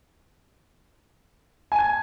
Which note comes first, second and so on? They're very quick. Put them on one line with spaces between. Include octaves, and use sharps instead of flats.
G#5 A5 G#6